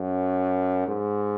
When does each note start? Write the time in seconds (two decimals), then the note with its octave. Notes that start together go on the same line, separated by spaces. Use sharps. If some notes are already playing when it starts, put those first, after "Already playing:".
Already playing: F#2
0.87 G#2